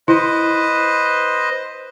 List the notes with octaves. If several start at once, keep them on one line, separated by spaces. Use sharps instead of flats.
E4 B4 C5 D#5